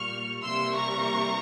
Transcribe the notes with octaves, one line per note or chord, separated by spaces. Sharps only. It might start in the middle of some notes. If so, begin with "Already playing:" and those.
Already playing: A#2 G3 A#3 C#6 F6
C3 E3 G3 A#3 C6 E6
A#5 C#6